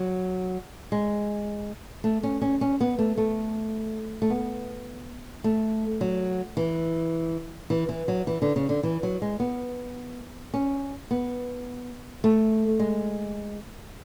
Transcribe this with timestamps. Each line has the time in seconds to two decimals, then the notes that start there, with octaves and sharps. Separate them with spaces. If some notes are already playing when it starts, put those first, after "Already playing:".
Already playing: F#3
0.92 G#3
2.04 A3
2.23 C#4
2.42 C#4
2.61 C#4
2.81 B3
2.98 A3
3.18 A3
4.22 A3
4.30 B3
5.44 A3
6.01 F#3
6.57 E3
7.70 E3
7.89 E3
8.08 F#3
8.27 E3
8.42 D3
8.56 C#3
8.69 D3
8.83 E3
9.03 F#3
9.22 G#3
9.40 B3
10.54 C#4
11.11 B3
12.24 A3
12.79 G#3